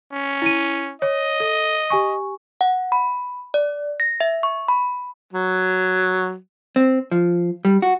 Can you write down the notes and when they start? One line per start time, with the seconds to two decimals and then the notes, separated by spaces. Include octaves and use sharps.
0.12 C#4
0.42 E4 D#7
1.02 C#5 D#5
1.40 A4
1.90 G4 G#5 C#6
2.61 F#5
2.92 B5
3.54 D5
4.00 A#6
4.20 E5
4.43 C#6
4.68 B5
5.33 F#3
6.76 C4
7.11 F3
7.65 G3
7.82 F#4